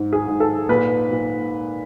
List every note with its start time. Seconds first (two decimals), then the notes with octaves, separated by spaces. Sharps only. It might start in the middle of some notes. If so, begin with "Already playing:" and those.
Already playing: G#2
0.13 G#4
0.27 G#2
0.40 A4
0.69 A#2 B4
1.11 A#2